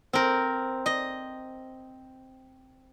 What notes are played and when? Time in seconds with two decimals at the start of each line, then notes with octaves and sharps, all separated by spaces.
0.13 C4 A#4
0.86 D#5